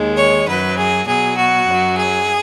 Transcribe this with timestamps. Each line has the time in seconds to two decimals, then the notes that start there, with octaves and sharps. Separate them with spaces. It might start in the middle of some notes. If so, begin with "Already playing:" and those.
Already playing: D#2 D#3 G#3
0.17 C#5
0.47 F#2 F#3 B4
0.77 G#4
1.07 B2 F#3 G#4
1.37 F#4
1.66 F#2
1.72 F#3
1.97 G#4